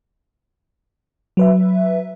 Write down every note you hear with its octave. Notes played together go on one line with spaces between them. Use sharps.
F#3 B4 E5